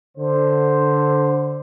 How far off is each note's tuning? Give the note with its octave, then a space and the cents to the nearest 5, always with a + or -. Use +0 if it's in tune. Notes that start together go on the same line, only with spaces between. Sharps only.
D3 +0 C5 +0